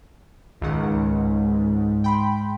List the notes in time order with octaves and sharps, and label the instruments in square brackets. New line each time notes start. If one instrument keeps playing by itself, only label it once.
[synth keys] C#2 D#3 F#5 [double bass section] G#2
[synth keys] G5 B5 C6